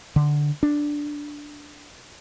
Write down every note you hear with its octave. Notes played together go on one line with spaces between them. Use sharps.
D3
D4